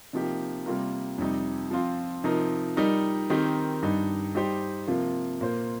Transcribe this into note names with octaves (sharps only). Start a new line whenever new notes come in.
C3 F3 A#3 D#4 G4
C3 G3 A#3 F4 A#4
F2 C3 G3 D#4
F3 C4 F4
C3 F3 D#4 A#4
G3 D#4 A#4
D#3 C4 D#4 G4 A#4
G2 G3 D#4
G3 D#4 G4 C5
C3 F3 A#3 F4
A#2 A#3 F4 C5